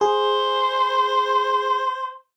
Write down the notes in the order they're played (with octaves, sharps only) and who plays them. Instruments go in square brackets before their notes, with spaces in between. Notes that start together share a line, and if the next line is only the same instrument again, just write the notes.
[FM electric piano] G#4 [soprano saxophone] C5